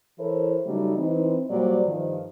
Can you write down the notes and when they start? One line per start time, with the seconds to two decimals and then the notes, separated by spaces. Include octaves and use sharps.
0.19 E3 E4 A4 A#4 C5 C#5
0.66 C#3 F#3 G3 A3 D#4
0.98 E3 C4 D#4
1.50 A#2 F#3 G3 A#3 C5 D5
1.86 G2 D#3 F3